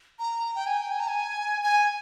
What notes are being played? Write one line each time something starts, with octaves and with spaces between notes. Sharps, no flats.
A#5
G5
G#5
G5
G#5
A#5
G#5
G#5